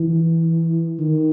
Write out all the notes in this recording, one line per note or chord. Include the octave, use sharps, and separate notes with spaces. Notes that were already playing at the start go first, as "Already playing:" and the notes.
Already playing: E3
D#3